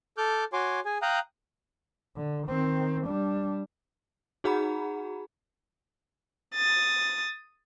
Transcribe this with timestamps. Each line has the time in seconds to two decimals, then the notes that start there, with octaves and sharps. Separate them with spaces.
0.18 A4 D6 F6 G6
0.53 F#4 C#5 G#5 C6 D6
0.85 G#4 G#5
1.02 F5 G5 A#5 D#6 F#6
2.16 D3
2.48 D#3 C4
3.07 G3 D4
4.44 D#4 F#4 G#4 F#5 A#5 B5
6.55 D#6 A6